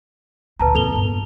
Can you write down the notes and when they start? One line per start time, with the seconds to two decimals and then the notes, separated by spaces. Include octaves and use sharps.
0.60 D2 A#2 B4 A5 A#5
0.75 F2 A#2 A4 F7 G7
0.92 G2 B3